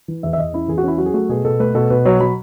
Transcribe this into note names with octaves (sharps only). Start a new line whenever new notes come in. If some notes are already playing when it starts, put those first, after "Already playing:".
E3
E2 E5
E5
E2 D#5
C#4 E4
E2 G#4
F#4
C#4 E4
F#3 F#4
G#4
A3 F#4
B2 G#4
B2 A4
A3 B4
B2 A4
B2 B4
F#3 C#5
F#3 B5